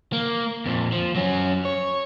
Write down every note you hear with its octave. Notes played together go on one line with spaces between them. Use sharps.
A#3
F2 A#2
F3
F#3 C#4
C#5